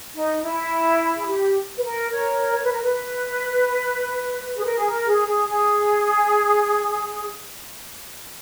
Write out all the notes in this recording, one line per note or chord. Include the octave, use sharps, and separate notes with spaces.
D#4
E4
G#4
G4
B4
A#4
A#4 C#5
C#5
B4
A#4
B4
G#4
A#4
G#4
A#4
G#4
G#4
G#4